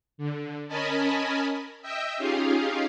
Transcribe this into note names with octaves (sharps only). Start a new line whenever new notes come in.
D3
C#4 A#4 D#5 G#5 A5 B5
D#5 E5 G5 E6
C#4 D#4 F4 G4 G#4 F5